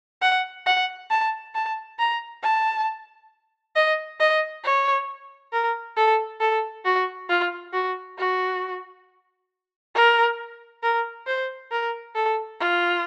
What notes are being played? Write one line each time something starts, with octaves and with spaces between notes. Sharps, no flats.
F#5
F#5
A5
A5
A#5
A5
D#5
D#5
C#5
A#4
A4
A4
F#4
F4
F#4
F#4
A#4
A#4
C5
A#4
A4
F4